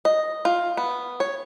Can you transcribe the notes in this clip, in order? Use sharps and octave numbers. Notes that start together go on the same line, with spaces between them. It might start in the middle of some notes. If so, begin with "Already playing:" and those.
D#5
F4
B3
C#5